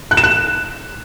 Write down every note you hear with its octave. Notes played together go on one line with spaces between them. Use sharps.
F#6
E7
F#6